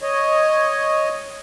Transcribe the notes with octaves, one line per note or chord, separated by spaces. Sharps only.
C#5 D#5